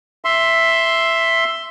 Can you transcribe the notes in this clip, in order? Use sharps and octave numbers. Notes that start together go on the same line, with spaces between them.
E5 C6